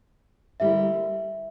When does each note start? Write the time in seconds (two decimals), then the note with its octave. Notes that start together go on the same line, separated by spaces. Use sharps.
0.60 D3 G3 A#3 E4 E5